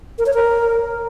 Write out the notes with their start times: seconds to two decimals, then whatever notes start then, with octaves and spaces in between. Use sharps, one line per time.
0.18 A#4
0.26 C#5
0.34 A#4